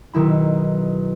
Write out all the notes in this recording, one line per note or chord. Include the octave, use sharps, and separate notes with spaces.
B1 D#3 E4 B5